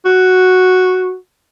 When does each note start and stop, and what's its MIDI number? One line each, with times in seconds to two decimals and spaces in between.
0.05 1.14 66